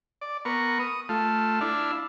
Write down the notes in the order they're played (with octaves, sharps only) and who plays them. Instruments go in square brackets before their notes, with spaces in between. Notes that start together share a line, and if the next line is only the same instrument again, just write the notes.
[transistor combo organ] D5
B3 A#4 C#6
D#6
A3 F4
D4 E4 F5